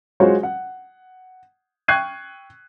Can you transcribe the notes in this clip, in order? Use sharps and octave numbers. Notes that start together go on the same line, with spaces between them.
G#3 F4 F#4 C5 C#5
F#5
G5 C#6 F#6 G#6 C7 D#7